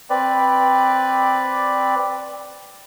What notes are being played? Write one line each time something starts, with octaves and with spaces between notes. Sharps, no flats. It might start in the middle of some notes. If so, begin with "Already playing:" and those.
C4 B4 D5